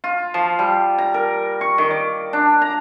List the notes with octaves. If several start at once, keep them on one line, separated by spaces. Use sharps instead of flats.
F4
F3
G3
A#5
A#4
C#6
D#3
D5
D4
A#5